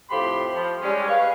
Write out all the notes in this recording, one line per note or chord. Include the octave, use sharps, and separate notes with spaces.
F2 A2 F3 G4 B5 C6
F3
G3 G#3 C#4
B4 F5 C#6